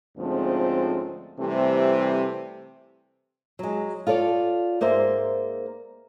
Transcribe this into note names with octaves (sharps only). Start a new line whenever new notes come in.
D2 G#2 F3 A3 C4 C#4
C3 E3 G3 A3 C4
F#3 G#3
F4 A4 C#5 D5
G#2 A#3 C5 D5 E5